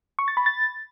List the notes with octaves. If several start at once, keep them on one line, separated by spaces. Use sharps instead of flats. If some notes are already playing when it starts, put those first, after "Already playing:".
C#6
A6
B5
A6